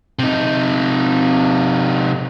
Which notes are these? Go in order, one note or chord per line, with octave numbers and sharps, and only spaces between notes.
C3 D#4